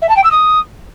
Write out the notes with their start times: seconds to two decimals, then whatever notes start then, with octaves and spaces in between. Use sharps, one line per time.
0.02 E5
0.09 A5
0.16 G5
0.23 E6
0.31 D#6